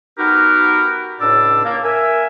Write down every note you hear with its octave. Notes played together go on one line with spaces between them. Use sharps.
B3 D#4 F#4 G4 A#4 B4
C#2 A2 D4 D5 E6
A#3
A#4 E5 G#5